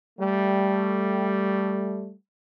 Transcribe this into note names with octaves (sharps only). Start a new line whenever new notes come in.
G3 A3